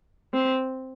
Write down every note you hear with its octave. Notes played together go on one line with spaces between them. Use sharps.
C4